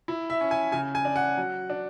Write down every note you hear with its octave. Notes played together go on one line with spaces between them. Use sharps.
E4
E5
C#4
G#5
C#3 G#5
G#5
D4
F#5
F#3
D4